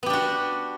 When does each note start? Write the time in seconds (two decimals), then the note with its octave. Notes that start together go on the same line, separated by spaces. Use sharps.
0.03 B3
0.06 G4
0.10 D4
0.13 F#4